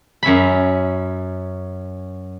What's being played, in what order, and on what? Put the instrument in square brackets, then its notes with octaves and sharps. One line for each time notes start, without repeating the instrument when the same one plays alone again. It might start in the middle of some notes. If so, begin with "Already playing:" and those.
[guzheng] F#2 C#4 E5 B5